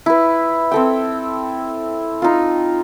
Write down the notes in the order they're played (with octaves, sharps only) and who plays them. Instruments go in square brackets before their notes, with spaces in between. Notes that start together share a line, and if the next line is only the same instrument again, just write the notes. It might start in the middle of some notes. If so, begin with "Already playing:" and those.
[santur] E4 B4
C4 A4 G5
D#4 F4